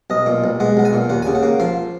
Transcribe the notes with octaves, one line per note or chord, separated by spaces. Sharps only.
B1 D#5
A#2
B1
G#3 F#5
B1 F#5
G#5
A#2
D#2 F#5
C#3 G#5
F#5
A#3
F3 F5